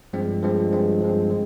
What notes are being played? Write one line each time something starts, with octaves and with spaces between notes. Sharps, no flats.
G2 F3 G#3 C4
G2 F3 G#3 C4
G2 F3 G#3 C4
G2 F3 G#3 C4
D#3 G#3